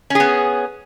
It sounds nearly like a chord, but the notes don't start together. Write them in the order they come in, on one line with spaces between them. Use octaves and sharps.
C#4 G#4 B3